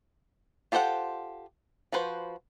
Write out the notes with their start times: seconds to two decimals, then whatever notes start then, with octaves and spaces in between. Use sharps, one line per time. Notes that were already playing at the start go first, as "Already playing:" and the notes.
0.72 F4 G4 A4 C5 F#5
1.92 F3 F#4 B4 C5